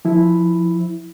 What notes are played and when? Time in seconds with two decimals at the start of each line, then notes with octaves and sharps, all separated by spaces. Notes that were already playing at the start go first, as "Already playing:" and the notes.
0.05 F3 E4